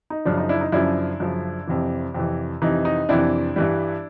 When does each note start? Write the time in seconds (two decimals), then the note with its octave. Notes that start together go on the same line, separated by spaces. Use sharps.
0.10 D#4
0.25 F#2 C#3 F3 D4
0.38 D#4
0.49 D4 E4
0.61 D#4
0.72 F#2 C#3 F3 D4 E4
1.20 F#2 C#3 F3
1.67 F2 C3 E3
2.14 F2 C3 E3
2.62 F2 C3 E3 D#4
2.85 D#4
3.09 F2 C3 E3 D4 E4
3.56 G2 E3 G3